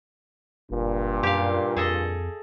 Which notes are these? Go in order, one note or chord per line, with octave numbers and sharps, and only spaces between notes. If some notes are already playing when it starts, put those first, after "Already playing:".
F#1 G2 A#2
F#2 G4 F5
F2 G#4 A4 D#5